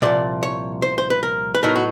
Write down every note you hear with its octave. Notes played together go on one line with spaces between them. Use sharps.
C2 A#2 F3 D5
C#5
C5
C5
B4
A#4
B4
A2 F#3 B3 D#4 A#4
F#4